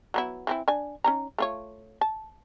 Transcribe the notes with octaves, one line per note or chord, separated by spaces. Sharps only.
F#3 B3 E4
E3 C4 E4
D4 G#5
C#4 D#4 A#5
A3 F4 C#5
A5